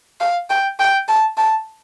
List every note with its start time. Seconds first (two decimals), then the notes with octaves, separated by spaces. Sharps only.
0.20 F5
0.50 G5
0.80 G5
1.08 A5
1.38 A5